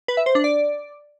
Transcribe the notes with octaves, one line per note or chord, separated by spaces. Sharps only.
B4
E5
C5
D4
D5